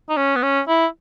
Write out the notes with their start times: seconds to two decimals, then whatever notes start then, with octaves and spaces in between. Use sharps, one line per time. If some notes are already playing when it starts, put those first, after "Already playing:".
0.09 D#4
0.17 C#4
0.36 B3
0.43 C#4
0.68 E4